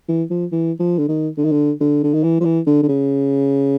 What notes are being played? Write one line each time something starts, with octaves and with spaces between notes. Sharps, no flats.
E3
F3
E3
F3
D3
D#3
D3
D#3
D3
D3
D3
D#3
E3
F3
E3
D3
D3
C#3